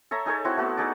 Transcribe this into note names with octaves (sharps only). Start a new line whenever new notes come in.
A4 C#5 E5 A#5
D#4 G#4 A4 C#5
C4 E4 F#4
A3 B3 F#4 A4
D#4 G#4 A4 D5